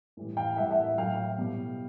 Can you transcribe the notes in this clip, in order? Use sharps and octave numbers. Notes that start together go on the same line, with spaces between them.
A2 E3 G3
F5 G5
A2 E3 G3 E5 F#5
E5 F#5
A2 F#3 F5 G5
B2 G3